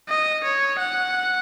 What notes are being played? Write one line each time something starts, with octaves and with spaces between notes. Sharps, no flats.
D#5
C#5
F#5